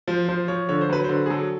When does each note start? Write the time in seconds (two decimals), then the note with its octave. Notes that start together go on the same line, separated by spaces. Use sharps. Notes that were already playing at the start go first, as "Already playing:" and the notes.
0.08 F3 C5
0.29 F3 C5
0.48 F3 C#5
0.69 D3 C#5
0.81 C5
0.89 F#3 B4
1.04 C5
1.09 D3
1.26 G#4
1.30 F#3 A4